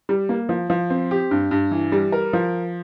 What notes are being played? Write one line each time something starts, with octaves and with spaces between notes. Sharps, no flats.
G3
A#3
F3
F3
C4
G4
G2
G2
E3
G3
A#4
F3